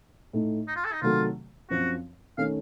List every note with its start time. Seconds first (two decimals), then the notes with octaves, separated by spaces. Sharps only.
0.33 A2 A3 D#4
0.68 D#4
0.76 F4
0.85 A4
0.93 D#4
1.02 C3 D#3 F#3 A3 F4
1.70 F#2 F3 C4 F#4
2.38 D#3 A3 C#4 F5